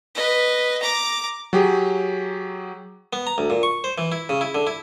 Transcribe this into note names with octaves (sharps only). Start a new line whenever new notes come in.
B4 D#5
A#5 D6
F#3 G4 G#4
B3
A#5
D2
A#2
C#6
C5
E3
E4
C#3
E4
D3
E4